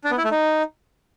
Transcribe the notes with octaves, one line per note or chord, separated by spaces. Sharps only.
D4
B3
E4
A3
D#4